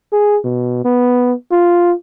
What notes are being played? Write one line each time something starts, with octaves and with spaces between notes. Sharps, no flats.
G#4
B2
B3
F4